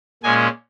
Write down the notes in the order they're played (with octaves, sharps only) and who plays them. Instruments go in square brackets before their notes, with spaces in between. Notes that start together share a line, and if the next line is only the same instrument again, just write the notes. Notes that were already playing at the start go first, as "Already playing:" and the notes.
[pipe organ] A#2 G#3 C#4 G#5